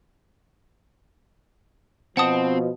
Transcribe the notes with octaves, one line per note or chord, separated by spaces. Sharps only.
B2 F3 C4 F#5 A5 D#6